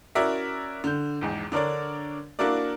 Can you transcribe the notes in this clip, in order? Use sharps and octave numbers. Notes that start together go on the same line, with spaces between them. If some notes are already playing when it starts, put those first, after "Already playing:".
C#4 E4 F#4 A#4 D5 E5
D3 G6
A#1 E2 G#2
D3 D4 A#4 C#5 D5
A#3 D4 E4 F#4 A#4 D5